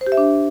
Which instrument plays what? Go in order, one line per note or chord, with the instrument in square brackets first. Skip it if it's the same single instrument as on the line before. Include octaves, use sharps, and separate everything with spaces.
[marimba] C5
G4
E5
D4